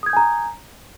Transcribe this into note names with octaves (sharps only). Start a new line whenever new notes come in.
G#5 A#5 D#6 G6 G#6